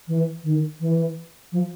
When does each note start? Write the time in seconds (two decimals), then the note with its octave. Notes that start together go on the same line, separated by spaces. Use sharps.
0.08 E3
0.44 D#3
0.80 E3
1.52 F3